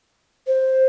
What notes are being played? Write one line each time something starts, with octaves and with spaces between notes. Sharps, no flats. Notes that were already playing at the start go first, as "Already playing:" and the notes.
C5